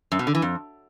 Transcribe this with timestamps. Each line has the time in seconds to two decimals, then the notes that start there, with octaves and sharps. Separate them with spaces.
0.12 F#2
0.19 B2
0.27 D3
0.35 E3
0.42 F2